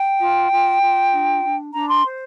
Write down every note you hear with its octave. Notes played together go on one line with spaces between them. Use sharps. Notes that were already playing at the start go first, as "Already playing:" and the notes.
Already playing: G5
F4
F4
F4
D4
D4
D4 A#5
C6
C5